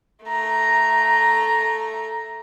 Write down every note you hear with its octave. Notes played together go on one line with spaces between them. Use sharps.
A3 A#5